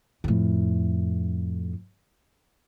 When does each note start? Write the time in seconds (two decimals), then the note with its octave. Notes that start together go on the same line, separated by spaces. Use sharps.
0.24 F2 A2